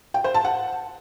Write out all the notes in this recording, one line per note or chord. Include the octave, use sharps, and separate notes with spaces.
G5
C5
A5
F#5